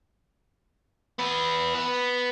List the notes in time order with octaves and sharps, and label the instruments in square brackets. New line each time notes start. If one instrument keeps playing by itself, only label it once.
[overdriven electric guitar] B3 E4
B3